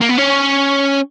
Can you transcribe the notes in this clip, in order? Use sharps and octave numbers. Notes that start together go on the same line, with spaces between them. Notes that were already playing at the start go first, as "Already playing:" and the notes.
A#3
B3
C#4